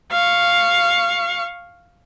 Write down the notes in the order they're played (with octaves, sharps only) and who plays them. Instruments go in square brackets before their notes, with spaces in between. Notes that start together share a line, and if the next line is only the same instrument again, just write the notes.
[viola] F5 C#6